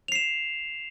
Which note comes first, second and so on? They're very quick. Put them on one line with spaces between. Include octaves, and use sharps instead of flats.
F7 C7 E7